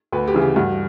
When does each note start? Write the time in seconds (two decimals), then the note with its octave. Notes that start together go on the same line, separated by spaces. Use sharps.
0.12 D2 B4
0.28 G4
0.34 C#3 E3
0.41 G4
0.56 G2 F#4